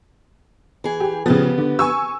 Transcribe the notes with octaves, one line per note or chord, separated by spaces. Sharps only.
E3 G#4
G4
C#3 F3 B3 G4
D3
G#5 C#6 E6